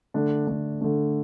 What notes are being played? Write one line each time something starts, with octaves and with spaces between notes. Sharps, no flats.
D3 A3 D4
D3 A3 D4
D3 A3 D4